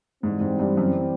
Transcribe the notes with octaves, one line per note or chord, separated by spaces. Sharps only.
G#2 E3 G3 C4
G#2
G2
F#2